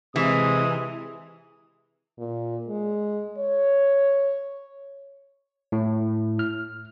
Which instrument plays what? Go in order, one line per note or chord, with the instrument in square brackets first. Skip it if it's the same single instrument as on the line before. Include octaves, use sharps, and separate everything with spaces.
[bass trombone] C3 [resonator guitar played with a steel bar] E3 [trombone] G#3 [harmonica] D#6
[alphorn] A#2
G#3
C#5
[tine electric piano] A2
F6